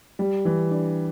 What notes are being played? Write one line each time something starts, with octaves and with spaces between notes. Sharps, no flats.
G3
E3
D4